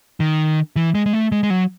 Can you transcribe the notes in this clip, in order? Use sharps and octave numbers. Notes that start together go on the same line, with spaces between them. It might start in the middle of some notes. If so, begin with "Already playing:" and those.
D#3
E3
G#3
G#3
A3
G#3
G#3
F#3